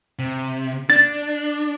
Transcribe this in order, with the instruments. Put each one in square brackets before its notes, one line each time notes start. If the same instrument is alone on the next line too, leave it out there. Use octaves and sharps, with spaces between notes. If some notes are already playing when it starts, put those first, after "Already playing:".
[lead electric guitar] C3
[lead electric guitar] D4 [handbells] A6